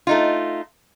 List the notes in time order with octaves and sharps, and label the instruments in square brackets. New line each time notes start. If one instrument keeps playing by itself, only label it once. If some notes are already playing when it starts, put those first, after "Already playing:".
[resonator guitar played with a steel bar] A3 D#4 F4